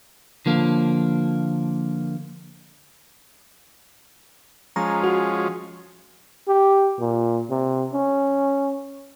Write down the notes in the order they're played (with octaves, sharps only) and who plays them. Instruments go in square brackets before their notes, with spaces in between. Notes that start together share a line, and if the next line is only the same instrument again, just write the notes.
[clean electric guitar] D3 F3 A#3
[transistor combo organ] F3 G#3 C#4 [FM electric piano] A#5
[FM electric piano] F#4
[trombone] G4
A#2
C3
C#4